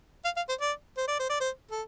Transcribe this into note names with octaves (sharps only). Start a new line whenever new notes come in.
F5
F5
C5
D5
C5
D5
C5
D5
C5
A4